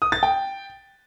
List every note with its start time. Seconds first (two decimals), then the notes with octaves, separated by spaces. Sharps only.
0.02 D#6
0.12 A6
0.23 G5